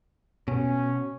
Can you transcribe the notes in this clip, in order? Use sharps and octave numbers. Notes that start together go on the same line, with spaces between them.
B2 C#4